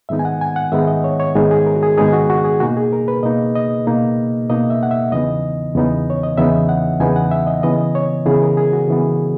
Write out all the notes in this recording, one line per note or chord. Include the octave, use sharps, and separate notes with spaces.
G#2 D#3 G#3 B3 D#4 E5
G#5
F#5
G#5
F#5
G#2 D#3 G#3 B3 D#4 E5
D#5
C#5
C#5
G#2 D#3 G#3 B3 D#4 G#4
G#4
A#4
F#4
G#4
G#2 D#3 G#3 B3 D#4 G#4
F#4
F#4
G#4
B2 A#3 D#4 F#4
G#4
A#4
B4
B2 A#3 D#4 D#5
D#5
B2 A#3 D#4
B2 A#3 D#4 D#5
E5
F#5
E5
E2 C#3 E3 B3 D#4 D#5
E2 C#3 E3 B3 D#4
C#5
D#5
E2 C#3 E3 B3 D#4 E5
F#5
E2 C#3 E3 B3 D#4 G#5
F#5
E5
D#5
C#3 E3 B3 D#5
C#5
C#3 E3 B3 G#4
A#4
G#4
F#4
C#3 E3 B3